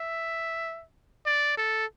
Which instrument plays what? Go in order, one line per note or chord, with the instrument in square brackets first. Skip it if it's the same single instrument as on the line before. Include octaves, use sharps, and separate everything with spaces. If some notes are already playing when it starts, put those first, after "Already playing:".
Already playing: [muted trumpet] E5
D5
A4